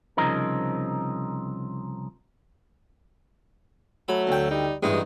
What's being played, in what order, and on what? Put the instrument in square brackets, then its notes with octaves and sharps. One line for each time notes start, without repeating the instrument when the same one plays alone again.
[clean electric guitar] C2 C#3 F3 C4 D#4 A#4
[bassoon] F#3 [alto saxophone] A3 [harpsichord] B5
[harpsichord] D2 G5
[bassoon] G3 [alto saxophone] D#4
[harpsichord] A1 G2 D#4 [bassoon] E3 [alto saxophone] G#3